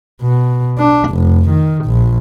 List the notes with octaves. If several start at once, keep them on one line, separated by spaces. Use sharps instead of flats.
B2
D4
F1
D#3
A#1